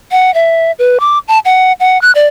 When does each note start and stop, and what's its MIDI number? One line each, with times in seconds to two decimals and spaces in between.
0.12 0.33 78
0.34 0.72 76
0.79 0.98 71
1.00 1.19 86
1.28 1.39 81
1.45 1.72 78
1.80 2.00 78
2.02 2.11 90
2.15 2.26 74